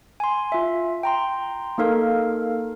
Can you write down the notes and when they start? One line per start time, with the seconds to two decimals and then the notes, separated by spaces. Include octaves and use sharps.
0.20 G#5 C6
0.52 F4 E5
1.03 G5 A#5 C6
1.78 A#3 D#4 A4 A#4 F5